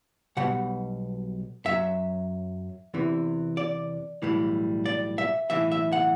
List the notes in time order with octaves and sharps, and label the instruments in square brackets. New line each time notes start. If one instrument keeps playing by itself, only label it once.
[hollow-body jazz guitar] B1 B2 G3 F#5
F#2 F#3 E5
E2 C3 E3
D5
B1 A2 E3 G3
D5
E5
B1 A2 E3 E5
E5
F#5